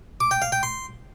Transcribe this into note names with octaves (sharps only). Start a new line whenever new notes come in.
D6
G5
F5
G5
C6